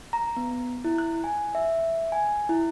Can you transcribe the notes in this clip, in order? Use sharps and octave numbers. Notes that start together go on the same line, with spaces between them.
A#5
B3
E4
F#6
G#5
E5
G#5
E4